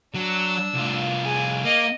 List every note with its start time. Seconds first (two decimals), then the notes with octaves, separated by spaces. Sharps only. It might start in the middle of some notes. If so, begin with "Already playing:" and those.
0.14 F#3 D4 E6
0.74 C2 F4
1.25 G#4
1.65 A#3 D#5